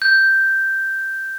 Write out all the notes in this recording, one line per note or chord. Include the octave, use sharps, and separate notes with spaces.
G6